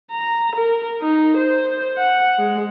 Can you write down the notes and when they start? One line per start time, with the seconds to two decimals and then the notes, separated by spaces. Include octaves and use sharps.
0.12 A#5
0.56 A#4
1.01 D#4
1.37 C5
1.98 F#5
2.39 G#3